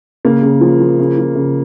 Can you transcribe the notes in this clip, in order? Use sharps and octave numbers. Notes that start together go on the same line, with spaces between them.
C#3 A#3
C#3
F3
F3
C#3
F3
C#3